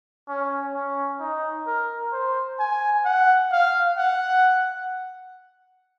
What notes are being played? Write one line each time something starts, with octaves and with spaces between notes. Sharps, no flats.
C#4
C#4
D#4
A#4
C5
G#5
F#5
F5
F#5